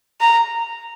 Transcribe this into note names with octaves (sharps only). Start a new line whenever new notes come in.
A#5